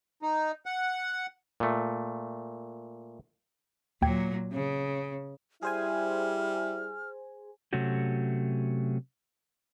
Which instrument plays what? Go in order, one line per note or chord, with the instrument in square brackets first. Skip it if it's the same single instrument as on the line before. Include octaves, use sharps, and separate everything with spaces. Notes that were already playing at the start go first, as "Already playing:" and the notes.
[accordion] D#4
F#5
[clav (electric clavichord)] A#2 A3
[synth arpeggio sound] D#2 G5 G#6 [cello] A#2 F#3
[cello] C#3
[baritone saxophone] G3 [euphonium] E4 [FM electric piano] G#4 C5 G#5 [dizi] F6
[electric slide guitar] C3 F#3 A3 C#4 F#4 G4